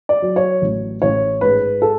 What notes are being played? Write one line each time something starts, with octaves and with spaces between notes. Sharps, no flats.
D5
F#3
C#5
A1
A1 C#5
G#2 B4
A4